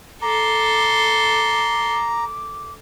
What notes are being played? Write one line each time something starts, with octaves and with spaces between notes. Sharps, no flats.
A4 A#5 C6 D6